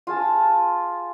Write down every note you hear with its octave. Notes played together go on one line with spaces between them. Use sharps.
F4 G#4 A5